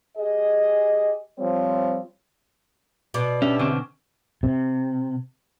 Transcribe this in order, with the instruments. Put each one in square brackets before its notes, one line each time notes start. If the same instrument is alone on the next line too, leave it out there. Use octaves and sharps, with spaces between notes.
[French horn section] G4 G#4 D#5
F3 G3 C4 C#5
[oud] B2 [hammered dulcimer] D5
[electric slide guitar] C#4 [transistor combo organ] D4 G4 E5
[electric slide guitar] D3 C4 [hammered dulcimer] C#4
[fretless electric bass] C3